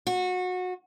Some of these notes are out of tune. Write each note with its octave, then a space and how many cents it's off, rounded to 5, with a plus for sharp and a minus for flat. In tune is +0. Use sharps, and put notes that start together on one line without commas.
F#4 -25